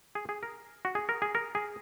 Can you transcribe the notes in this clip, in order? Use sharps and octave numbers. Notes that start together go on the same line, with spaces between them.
G#4
G#4
A#4
F#4
G#4
A#4
G#4
A#4
G#4